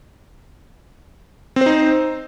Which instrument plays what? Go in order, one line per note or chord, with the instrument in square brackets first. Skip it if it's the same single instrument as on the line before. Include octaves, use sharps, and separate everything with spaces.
[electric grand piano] C4
C5
D#4